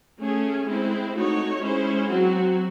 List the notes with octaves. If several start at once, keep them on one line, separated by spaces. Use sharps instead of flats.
A3 C#4 G#4
G#3 C4 E4
A3 D#4 F#4 C#5
G#3 C#4 E4 C5
F#3 C4 F#4